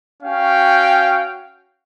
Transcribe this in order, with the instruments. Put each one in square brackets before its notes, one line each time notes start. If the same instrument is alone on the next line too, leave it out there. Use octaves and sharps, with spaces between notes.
[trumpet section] C#4 F#4 F5 G5